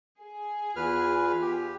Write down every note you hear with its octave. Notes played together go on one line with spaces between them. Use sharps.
G#4
E2 F4 B4 F6
G4